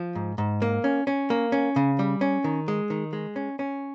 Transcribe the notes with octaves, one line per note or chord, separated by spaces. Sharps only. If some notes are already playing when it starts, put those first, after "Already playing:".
Already playing: F3
G#2
G#2
A#3
C#4
C#4
A#3
C#4
C#3
G3
C#4
D#3
G#3
D#3
G#3
C#4
C#4